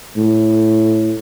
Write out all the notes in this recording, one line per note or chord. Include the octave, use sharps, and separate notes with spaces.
A2